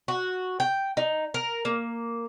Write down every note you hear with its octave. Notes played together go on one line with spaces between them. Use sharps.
F#4
G5
D#4
A#4
A#3